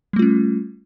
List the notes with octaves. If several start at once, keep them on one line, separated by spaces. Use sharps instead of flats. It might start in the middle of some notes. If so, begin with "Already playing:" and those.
G3 A3 C#4 F4